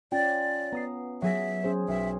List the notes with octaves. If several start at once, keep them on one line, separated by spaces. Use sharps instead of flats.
C#4 F4 D5 G5
B3 A#5 D#6 C7
F#3 G#4 E5 A#6
C#4 G#4 C5
B1 E5